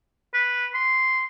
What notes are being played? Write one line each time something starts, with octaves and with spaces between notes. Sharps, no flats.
B4
C6